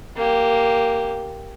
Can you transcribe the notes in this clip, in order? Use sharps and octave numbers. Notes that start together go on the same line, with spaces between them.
A#3 G4